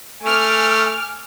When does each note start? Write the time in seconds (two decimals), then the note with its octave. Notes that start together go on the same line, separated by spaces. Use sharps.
0.23 A3 G#5 D6 F6